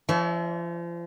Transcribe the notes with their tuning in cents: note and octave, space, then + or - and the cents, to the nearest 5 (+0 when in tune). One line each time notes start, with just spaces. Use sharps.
F3 -35 C#5 +45 E5 +0